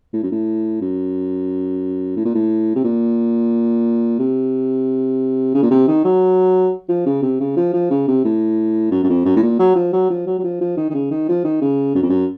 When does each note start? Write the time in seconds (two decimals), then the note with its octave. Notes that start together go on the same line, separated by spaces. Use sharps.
0.13 A2
0.23 F#2
0.32 A2
0.81 F#2
2.16 A2
2.25 A#2
2.35 A2
2.76 C3
2.84 A#2
4.19 C3
5.55 C#3
5.63 A#2
5.71 C3
5.88 D#3
6.05 F#3
6.89 F3
7.06 C#3
7.22 C3
7.40 C#3
7.57 F3
7.73 F3
7.91 C#3
8.08 C3
8.24 A2
8.91 F#2
9.04 F#2
9.09 F2
9.25 F#2
9.36 A2
9.43 A#2
9.59 F#3
9.76 F3
9.93 F#3
10.10 F3
10.27 F#3
10.39 F#3
10.44 F3
10.61 F3
10.77 D#3
10.90 D#3
10.94 C#3
11.11 D#3
11.29 F3
11.44 D#3
11.62 C#3
11.95 F#2
12.03 F2
12.09 F#2